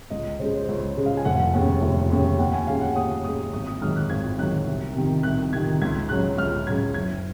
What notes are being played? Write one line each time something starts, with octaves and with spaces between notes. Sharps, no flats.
C#2 D#5
C#3 G#3 C5
C5
C#2 C#5
C#3 G#3
F5
G#5
F1 F#5
D#2 C#3
F1
D#2 C#3
D#2 F#5
G#5
C#3 G#3 F5
F#5
D#2 D#6
C#3 G#3 D#6
G#1 D#6
D#6
G#2 D#3 F#3 F6
F#6
G#1 G#6
G#2 D#3 F#3 F#6
C2
C3 D#3
C2 F#6
C3 D#3 G#6
C#2 G#6
C#3 F#3 F#6
C#2 F6
C#3 F#3 G#6
F#1 G#6